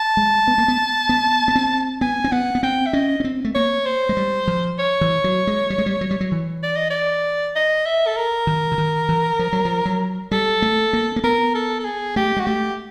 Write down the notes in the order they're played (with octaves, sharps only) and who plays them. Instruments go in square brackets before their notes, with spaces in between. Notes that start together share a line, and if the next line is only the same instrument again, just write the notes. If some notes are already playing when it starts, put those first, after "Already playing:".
Already playing: [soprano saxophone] A5
[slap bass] G#3
B3
A#3
B3
B3
B3
C4
[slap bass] B3 [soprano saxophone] G#5
[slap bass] C4
[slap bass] B3 [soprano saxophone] F#5
[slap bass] B3
[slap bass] C4 [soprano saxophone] G5
[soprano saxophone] E5
[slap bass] C#4 [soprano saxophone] D#5
[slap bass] C#4
C4
A3
[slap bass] A#3 [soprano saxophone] C#5
[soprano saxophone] C5
[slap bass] G#3
G3
F3
[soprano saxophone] C#5
[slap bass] E3
F#3
G#3
G3
G#3
G3
F#3
G3
F#3
E3
[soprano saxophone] D5
D#5
D5
D#5
E5
A4
A#4
[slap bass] D#3
D3
D#3
E3
F3
F#3
F3
F#3
[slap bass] G3 [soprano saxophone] A4
[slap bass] A3
A#3
A#3
[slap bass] B3 [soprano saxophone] A#4
[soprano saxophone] A4
A4
G#4
[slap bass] A3 [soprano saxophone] G4
[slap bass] G#3 [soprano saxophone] F#4
[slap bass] A3 [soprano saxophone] G4